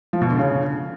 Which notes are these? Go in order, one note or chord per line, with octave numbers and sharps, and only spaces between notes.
F3
B2
D3
C#3